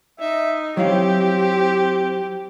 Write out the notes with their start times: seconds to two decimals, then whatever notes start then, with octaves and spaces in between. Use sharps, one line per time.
0.20 D#4 E5
0.77 F#3 C4 E4 G4 F5